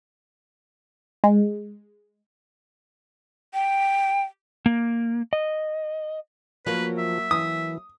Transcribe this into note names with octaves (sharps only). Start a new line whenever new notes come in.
G#3
G5
A#3
D#5
F3 F#3 A#3 B4
E5
E3 D#6